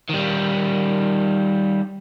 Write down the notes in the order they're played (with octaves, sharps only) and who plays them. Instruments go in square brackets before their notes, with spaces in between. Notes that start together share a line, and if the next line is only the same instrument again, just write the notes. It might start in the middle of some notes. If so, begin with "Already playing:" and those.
[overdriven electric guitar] D#3 G3